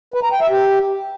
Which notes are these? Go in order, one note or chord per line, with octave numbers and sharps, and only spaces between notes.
B4
A#5
G5
E5
G4